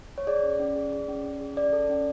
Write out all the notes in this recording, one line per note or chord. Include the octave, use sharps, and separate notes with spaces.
C#5
G#4 D5
C#4
C#4
G#4
G#4
C#4
C#4
G#4
C#4 D5
A4
C#4